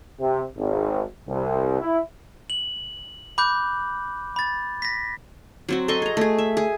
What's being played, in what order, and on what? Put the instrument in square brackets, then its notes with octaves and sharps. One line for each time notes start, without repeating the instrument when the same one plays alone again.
[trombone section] C3
G#1
C2
E4
[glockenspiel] F#7
B5 D6 F#6 G6
B5 A6
A#6 B6
[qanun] F#3 C4 F#4
A4 D#5 C6 C#6
G#4 A#5
A3 G#4
E5
G#4